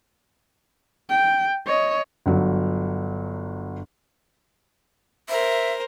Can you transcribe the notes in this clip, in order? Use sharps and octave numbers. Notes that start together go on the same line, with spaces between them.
G5
C#5 D#5
G1 F#3
A#4 C5 E5